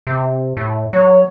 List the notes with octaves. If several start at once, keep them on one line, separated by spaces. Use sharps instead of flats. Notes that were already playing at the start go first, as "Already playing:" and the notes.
C3
A2
F#3 C#5